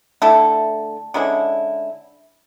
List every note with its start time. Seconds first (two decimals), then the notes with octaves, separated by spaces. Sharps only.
0.22 D3 A3 E4 A4
1.14 D3 G#3 C#4 E4